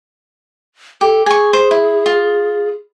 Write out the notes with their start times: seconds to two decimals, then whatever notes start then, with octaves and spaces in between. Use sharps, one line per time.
1.01 G4 A4
1.26 G#4 G#5 C#6
1.53 C5
1.71 E4
2.06 F4